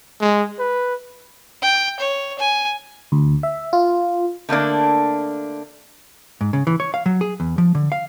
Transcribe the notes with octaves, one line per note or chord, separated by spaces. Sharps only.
G#3
B4
G5
C#5
G#5
D2
E5
F4
D3 A3 A#3 D4
G#2
C#3
E3
C#5
F5
F#3
G#4
E2
F3
D3
F5